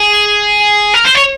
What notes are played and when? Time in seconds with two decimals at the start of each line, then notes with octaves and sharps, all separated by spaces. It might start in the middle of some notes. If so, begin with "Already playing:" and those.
Already playing: G#4
0.94 A#4
1.05 C5
1.15 C#5